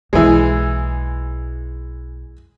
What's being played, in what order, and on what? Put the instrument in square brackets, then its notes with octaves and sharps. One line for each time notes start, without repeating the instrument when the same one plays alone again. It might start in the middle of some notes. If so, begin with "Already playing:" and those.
[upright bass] B1 [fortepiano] E3 G#3